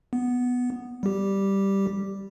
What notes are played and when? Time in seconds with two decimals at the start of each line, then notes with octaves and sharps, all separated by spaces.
0.13 B3
1.03 G3 G4